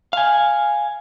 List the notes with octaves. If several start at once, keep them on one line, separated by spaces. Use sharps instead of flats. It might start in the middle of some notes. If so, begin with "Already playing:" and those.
F5 G#5